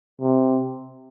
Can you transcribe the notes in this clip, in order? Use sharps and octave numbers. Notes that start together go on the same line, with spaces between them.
C3